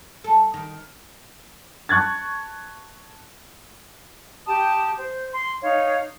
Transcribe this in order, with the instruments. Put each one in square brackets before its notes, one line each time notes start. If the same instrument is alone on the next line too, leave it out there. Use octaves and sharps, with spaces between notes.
[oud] A4
D#3
[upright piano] A5 C#6 F#6 G#6 A6
[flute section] G4 G5 A5 D#6
C5
C6
D#4 C#5 F5